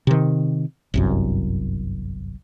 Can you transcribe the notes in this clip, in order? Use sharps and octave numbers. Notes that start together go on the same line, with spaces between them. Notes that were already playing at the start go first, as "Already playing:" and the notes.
C3 D#3
G1 C2 F#2